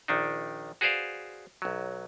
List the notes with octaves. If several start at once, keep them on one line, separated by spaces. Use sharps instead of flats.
A#1 D#3 D4 D#4
F#4 G#4 B4 C5 D5 F5
B1 F#3